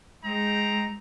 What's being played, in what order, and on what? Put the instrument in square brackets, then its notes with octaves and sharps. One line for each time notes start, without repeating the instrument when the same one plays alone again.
[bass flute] G#3 [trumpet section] C4 D#4 A#5